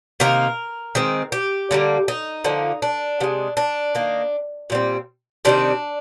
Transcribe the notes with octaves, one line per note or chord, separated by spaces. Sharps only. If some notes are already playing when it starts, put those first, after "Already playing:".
C3 D#3 A#3 A#4
D#3 G#3 C4
G4
D3 G3 A#3
D#4
D3 F3 A#3
D4
C3 F3 G#3
D4
D#3 A#3
A#2 G3 C4
C3 D#3 G3 C4 D4